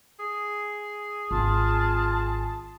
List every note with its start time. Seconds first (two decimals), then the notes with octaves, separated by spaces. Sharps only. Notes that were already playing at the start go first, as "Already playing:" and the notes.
0.19 G#4
1.31 G#1 F4 A5